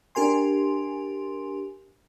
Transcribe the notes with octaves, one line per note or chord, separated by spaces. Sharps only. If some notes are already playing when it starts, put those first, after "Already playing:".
D4 G4 A#4 G#5 C6